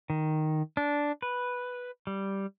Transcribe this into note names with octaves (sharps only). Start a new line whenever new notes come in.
D#3
D4
B4
G3